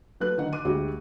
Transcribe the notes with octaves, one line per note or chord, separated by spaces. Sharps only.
F#3 A3 B4 F#6
D3 D#3 F#5
D6 D#7
D2 G#3 F#4 G4